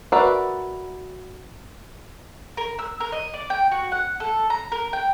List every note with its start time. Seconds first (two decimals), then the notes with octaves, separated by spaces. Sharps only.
0.12 F#4 A#4 B4 D5 E5
2.57 A#4
2.79 E6
3.00 A#4
3.12 D#5
3.34 D5
3.50 G5
3.72 F#4
3.92 F#5
4.20 A4
4.50 A#5
4.72 A#4
4.93 G5